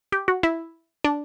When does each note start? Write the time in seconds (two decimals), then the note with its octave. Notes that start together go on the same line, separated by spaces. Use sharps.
0.12 G4
0.28 F#4
0.43 E4
1.04 D4